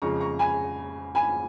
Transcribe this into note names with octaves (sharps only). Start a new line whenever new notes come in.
F2 C#3 F3 G#3 A#5 C#6
A#5 C#6
G#5 B5
G#5 B5